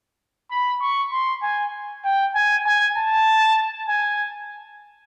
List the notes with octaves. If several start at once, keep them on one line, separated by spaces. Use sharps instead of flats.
B5
C#6
C6
G#5
G5
G#5
G#5
A5
G#5